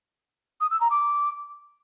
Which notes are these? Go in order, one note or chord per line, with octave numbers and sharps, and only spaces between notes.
D#6
E6
A#5
D6